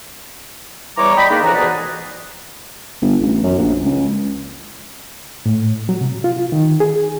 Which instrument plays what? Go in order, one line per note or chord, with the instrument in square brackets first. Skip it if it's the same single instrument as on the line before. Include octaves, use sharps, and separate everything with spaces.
[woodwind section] E2 E3 G3 C#5 A#5 D6
D5 D#5 G5 B5
D#3 G#3 A#3 D4 D#4
F2 C#3 E3 F#4 A#5
G#2 B2 E3 G#4 B4 D5
[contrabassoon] G1
A1
F#2
A#1
C#2
[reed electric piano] A2
F#3
C3
F4
D#3
G#4